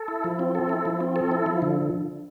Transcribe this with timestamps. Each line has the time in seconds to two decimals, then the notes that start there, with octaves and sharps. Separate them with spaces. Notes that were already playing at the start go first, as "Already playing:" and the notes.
Already playing: A4
0.08 E4
0.24 F3
0.39 C4
0.55 A4
0.69 E4
0.85 F3
1.01 C4
1.16 A4
1.31 E4
1.46 F3
1.62 D3